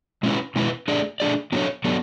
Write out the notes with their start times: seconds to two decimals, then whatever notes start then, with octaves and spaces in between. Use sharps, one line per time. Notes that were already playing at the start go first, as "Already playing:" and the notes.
0.23 B2 G#3 C#4 E4 B4
0.56 B2 G#3 C#4 E4 B4
0.88 A3 D4 G#4 D5
1.20 A3 D4 G#4 D5
1.52 F#3 B3 D4 A4 C#5
1.84 F#3 B3 D4 A4 C#5